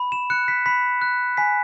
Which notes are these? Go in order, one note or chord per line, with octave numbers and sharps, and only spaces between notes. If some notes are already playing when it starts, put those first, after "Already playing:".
Already playing: B5
E7
F#6 C#7
B6
B5 B6
F#6
G#5 B6